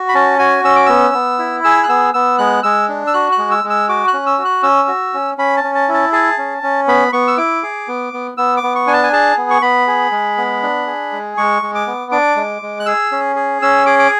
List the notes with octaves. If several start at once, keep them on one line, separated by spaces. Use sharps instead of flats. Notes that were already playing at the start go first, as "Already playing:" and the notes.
Already playing: F#4
B5
C#4 A5
F#4 G#5
C#4 E6
D6
B3 E6
B3
E4
G#4 E6
F#6
B3 E6
B3 E6
G#3 F#6
G#3 E6
D4
E6
F#4 F#6
F#6
G#3
E6
G#3
E6
F#4 D6
F#6
C#4
E6
F#4
F#6
C#4 E6
F#4
C#4
C#4 B5
A5
C#4
A5
E4
A5
G#4 A5
C#4
C#4
B3 B5
B3 C#6
E6
E4 D6
G#4
B3
B3
B3 E6
D6
B3
C#6
D4 G#5
A5
G#5
G#4 A5
B3
C#6
B3 B5
G#4
G#3
B3
D4
G#4
G#3
G#3 C#6
G#3
D6
B3
D4 D6
G#3
G#3
F#6
G#4 E6
C#4
G#4
C#4 E6
G#4 D6
D6